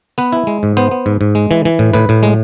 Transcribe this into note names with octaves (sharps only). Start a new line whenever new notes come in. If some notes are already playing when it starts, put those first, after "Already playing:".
B3 B4
E4
G#3
G#2
B3 C5
B3
G#2
G#2
G#3
E3
E3
A2
A2 B4
A2
G#3